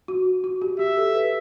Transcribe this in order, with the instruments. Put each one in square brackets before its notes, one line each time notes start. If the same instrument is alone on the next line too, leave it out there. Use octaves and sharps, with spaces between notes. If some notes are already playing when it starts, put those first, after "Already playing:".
[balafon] F#4
F#4
G4
[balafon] G4 [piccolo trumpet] E5
[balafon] A4
B4